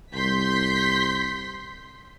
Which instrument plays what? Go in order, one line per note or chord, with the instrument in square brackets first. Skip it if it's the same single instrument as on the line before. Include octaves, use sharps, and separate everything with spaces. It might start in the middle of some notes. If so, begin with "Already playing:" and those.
[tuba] C2 [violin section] C6 G6 B6